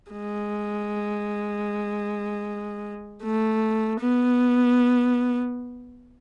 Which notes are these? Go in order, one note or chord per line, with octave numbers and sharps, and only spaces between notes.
G#3
A3
B3